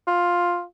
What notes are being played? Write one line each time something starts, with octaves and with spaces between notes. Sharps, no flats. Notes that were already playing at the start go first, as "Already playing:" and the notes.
F4